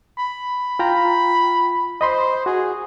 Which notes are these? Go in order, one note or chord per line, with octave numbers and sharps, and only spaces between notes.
B5
F4 G5 A#5
C5 D#5 B5 C6
F#4 G#4